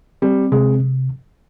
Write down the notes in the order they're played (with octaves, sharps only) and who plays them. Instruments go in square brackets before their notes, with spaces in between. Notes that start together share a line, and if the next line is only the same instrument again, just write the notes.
[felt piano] G3 [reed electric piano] C4
[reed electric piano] C3 [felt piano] G#3